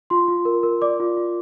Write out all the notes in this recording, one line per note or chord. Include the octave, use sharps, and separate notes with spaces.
F4 C6
F4
A#4
A#4
D5 D6
F4
F4